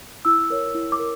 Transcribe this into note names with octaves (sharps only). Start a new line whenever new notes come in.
E4 E6
A#4 C#5
E4
D6
A#4